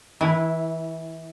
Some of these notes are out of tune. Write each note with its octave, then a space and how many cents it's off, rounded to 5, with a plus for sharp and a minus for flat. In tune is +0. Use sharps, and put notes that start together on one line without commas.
E3 -25 E4 +0